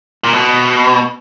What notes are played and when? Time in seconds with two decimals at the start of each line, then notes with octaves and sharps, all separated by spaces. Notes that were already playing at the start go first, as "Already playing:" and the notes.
0.24 A#2
0.34 B2